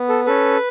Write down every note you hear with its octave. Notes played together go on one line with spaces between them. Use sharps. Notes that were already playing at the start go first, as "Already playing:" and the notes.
Already playing: B3
A4
C#4 A4 B4